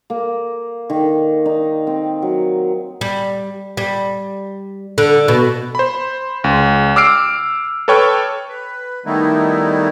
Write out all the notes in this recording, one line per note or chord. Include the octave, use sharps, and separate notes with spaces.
A#3
D#3
D#4
C4
F#3
G3
G3
D3
B2
C5 B5
C#2
D6 E6 F6 C7 D7
A4 B4 C#5 G5 C#6 F6
B4
D#3 G3 A3 B3 D#4 E4